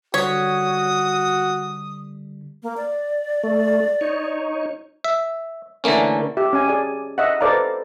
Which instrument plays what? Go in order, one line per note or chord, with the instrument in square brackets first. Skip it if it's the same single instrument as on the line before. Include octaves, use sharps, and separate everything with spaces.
[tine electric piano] D3 G3 B6 [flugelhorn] F#4 [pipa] C#5 [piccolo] D#6
[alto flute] A#3
D5
[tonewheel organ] A3
D#4 C#5
[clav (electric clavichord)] E5
D3 E3 A3 A#3 C#4
[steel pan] G4 E5
C#4 G#5
G#4 D5 G#5
D#5 E5 F#5
A4 B4 C5 D5 F5 A#5